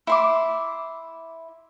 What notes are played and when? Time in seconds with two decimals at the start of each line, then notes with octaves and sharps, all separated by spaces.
0.07 E4 C6 D6